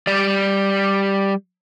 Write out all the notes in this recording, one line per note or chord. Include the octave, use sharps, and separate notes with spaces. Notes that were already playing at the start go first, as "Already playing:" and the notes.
G3 D5